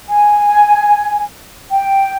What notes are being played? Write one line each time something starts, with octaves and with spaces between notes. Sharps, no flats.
G#5
G5